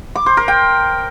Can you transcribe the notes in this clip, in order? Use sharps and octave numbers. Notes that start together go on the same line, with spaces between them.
D6
C5
A#4
G5